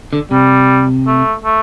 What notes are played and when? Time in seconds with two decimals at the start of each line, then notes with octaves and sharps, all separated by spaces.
0.13 D3
0.31 C3 G3
1.07 A3
1.44 A3